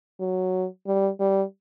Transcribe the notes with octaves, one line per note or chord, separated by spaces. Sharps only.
F#3
G3
G3